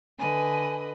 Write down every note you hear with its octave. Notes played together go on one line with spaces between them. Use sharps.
D3 B4 D#5 G#5